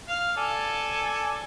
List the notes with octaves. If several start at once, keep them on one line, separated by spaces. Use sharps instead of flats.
F5
A4 D5 G#5